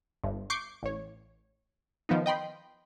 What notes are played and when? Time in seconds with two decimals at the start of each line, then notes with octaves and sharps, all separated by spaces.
0.24 G1 G2
0.50 C#6 D6 G6 C7
0.83 A1 C#5
2.09 D#3 F3 B3 D#4
2.26 D#5 G5 B5 C6